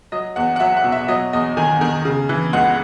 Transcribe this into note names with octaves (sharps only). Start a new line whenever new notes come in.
F#3 D#5
E2 F#5
F#5
F#3 E5
F#5
B2
E5
F#3 D#5
E2 D#5
D#3 G#5
D#3
C#3
E3
C#2 F#5